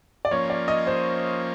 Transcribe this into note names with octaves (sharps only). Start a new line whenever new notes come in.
D5
F3 A#3 C#4 C#5
D5
D#5
C5